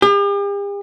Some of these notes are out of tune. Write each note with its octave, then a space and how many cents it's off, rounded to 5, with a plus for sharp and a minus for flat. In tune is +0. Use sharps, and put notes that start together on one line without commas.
G4 +45